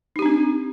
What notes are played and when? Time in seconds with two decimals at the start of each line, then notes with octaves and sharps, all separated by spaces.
0.16 D#4
0.19 G4
0.22 D4
0.26 C4